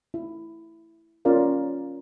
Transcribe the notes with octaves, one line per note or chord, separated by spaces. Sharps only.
E4
C#4 F4 A#4 D5 F5